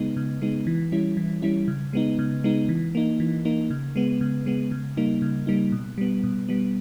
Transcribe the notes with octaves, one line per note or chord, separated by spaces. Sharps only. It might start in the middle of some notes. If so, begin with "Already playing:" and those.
Already playing: C#3 G#3 B3 D#4
C#3
G#3 B3 D#4
E3
G3 C#4 E4
E3
G3 C#4 E4
C#3
G#3 B3 D#4
C#3
G#3 B3 D#4
E3
A#3 D#4
E3
A#3 D#4
C#3
G#3 B3
C#3
G#3 B3
C#3
G3 A#3 D#4
C#3
G3 A#3 D#4
B2
G3 B3
B2
G3 B3